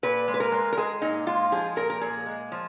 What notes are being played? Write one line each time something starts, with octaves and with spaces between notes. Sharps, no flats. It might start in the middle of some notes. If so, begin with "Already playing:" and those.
A#2 B4
G#3
B4
A#4
G#3
A#4
G#3 G#4
A#2 D#4
G#3 F4
F3 G#4
A#2 A#4
A#4
A#2 G#4
G#3
F3